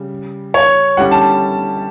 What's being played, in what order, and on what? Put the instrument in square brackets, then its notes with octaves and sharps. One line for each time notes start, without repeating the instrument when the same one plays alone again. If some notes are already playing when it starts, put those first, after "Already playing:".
Already playing: [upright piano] C#3 G3
[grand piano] C#5
[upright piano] D3 G3 C#4 E4 G4 [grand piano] F#5
[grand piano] A5